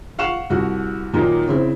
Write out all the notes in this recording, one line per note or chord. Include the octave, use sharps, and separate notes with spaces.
F5 F#5 C#6 E7
C2 F#4
A#2 D#3 F#3 A#3 D#4 F4
C#3 C4 E4